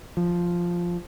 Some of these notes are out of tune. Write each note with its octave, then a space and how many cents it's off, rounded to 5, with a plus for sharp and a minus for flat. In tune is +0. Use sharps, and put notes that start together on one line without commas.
F3 +0